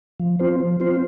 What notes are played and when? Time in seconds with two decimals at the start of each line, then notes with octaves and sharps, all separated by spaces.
0.20 F3
0.39 C4 F4 C5
0.60 F3
0.80 C4 F4 C5